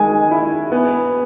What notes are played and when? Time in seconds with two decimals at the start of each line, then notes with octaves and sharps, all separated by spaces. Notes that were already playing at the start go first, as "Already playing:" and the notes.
Already playing: D#3 G#3 G#5
0.31 E4
0.72 B3